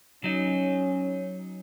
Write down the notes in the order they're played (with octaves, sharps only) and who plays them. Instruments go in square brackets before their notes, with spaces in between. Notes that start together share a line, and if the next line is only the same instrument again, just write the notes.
[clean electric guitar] F#3 D#4 [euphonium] C#4